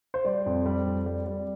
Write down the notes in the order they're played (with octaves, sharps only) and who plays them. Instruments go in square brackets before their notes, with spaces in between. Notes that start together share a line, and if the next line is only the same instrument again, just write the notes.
[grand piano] C5
G3 D5
F2
G3
F2
G3
G3